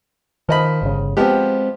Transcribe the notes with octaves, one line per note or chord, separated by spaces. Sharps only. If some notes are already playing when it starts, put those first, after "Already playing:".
D#3 F3 D#5 B5
G1 C#3
F3 G#3 B3 C4 G4